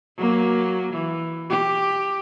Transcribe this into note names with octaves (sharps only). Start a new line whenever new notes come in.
F#3 A#3
E3
G4